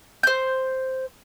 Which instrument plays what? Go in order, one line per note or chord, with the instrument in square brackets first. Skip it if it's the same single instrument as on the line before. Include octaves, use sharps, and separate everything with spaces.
[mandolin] C5 G6